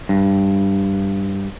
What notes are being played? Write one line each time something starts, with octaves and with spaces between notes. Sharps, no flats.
G2